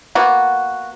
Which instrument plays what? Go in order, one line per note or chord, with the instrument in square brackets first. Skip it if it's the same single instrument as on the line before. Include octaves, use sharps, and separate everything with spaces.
[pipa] A#3 B3 F#4